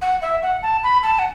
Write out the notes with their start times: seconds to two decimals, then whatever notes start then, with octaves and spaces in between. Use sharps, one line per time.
0.02 F#5
0.22 E5
0.43 F#5
0.63 A5
0.84 B5
1.03 A5
1.19 F#5